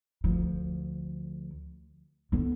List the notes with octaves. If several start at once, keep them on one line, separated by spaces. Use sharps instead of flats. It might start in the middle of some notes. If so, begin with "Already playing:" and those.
D2 F3
D3 B3